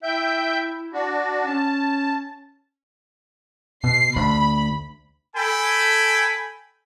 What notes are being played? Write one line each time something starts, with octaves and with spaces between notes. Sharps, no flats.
E4 E5 G5 G6
D4 F#4
C#4 A5
B2 C7
D2 B5
A4 G5 G#5 B5